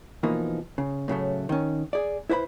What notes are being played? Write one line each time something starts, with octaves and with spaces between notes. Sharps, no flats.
B2 E3 F3 A#3 D#4
C#3
A2 C#3 F#3 A3
D#3 C#4
G#4 D5
E4 B4 C5 D#5 B5